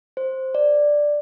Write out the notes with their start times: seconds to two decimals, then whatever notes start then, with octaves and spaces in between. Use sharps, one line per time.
0.17 C5
0.55 D5